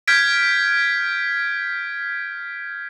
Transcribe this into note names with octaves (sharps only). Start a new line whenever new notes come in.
F6 G6 G#6 B6 D7